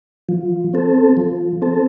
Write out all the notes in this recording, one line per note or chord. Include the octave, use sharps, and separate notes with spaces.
F3
C4 A4
F3
C4 A4